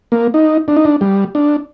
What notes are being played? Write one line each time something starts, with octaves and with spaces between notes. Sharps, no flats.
A#3
D#4
D4
D#4
D4
G3
D4